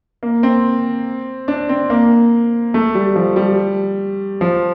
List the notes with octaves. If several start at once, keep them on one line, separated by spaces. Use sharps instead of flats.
A#3
C4
D4
C4
A#3
A3
G3
F3
G3
F3